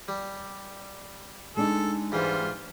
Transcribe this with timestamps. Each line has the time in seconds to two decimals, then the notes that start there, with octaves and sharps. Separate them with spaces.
0.08 G3
1.57 G#3 D4 D#4 A4
2.12 G#2 E3 G3 F4